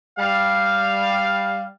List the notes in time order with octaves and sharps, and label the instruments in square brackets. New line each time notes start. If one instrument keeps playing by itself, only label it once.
[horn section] G3 F5